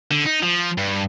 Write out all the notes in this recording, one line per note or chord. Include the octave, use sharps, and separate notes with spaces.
D3
D#4
F3
G2